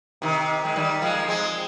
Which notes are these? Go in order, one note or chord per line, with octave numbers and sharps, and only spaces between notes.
C3 D#3
G#3
D#3 G3
F3 G#3
G#3 C4